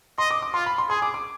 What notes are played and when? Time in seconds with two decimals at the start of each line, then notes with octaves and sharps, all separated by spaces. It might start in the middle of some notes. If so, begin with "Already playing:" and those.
0.18 D#5 C6
0.31 D6
0.42 D6
0.54 F4 C6
0.66 B5
0.78 C6
0.90 G#4 C6
1.02 D6
1.14 D6